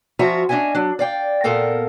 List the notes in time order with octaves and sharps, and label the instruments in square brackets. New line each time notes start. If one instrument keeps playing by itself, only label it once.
[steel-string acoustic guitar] F3 C#4 F4 F#4 E5 A#5
C#4 D4 E4 D#5 E5 G#5
F#3 D4
D5 F5 G5
A#2 B3 A4 A#4 F5 G5